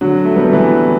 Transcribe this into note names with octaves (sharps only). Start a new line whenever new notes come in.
D3 F#3
A3
G3 B3
E3 G3